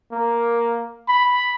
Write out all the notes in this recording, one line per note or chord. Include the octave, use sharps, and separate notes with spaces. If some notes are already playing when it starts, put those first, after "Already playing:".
A#3
B5